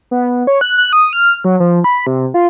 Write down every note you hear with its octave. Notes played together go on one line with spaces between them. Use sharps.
B3
C#5
F#6
F#6
D#6
F6
F#3
F3
B5
C3
F4